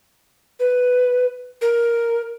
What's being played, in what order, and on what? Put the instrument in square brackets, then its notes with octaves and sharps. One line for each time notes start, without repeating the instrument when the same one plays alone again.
[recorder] B4
A#4